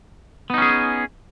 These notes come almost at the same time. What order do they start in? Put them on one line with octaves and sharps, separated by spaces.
B3 D#4 C#4 G#4